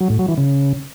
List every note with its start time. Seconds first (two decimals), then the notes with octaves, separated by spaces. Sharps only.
0.01 F#3
0.10 A2
0.19 F#3
0.28 E3
0.38 C#3